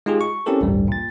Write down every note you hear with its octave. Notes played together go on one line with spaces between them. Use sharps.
G#3 D#4 F4 G4 G#4
C#6
C4 C#4 E4 G4 A4 A#4
A1 D2 G2 G3
A#2 A6